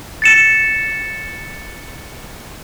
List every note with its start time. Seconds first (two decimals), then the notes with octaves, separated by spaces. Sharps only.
0.22 A6 C#7 E7